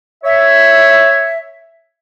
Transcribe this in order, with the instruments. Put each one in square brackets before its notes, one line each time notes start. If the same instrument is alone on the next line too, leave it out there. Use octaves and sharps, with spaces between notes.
[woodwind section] C#5 E5